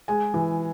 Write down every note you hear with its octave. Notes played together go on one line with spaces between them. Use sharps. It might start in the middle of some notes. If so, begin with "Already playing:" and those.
G#3 G#5
E3